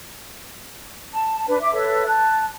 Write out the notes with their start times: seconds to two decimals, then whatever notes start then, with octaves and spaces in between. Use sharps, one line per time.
1.13 A5
1.47 D4 B4
1.61 E5 D6
1.73 A4 B4 C#5 E5
2.06 A5 F#6